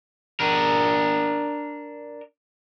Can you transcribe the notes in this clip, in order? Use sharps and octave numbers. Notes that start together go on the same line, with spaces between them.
D4 A#4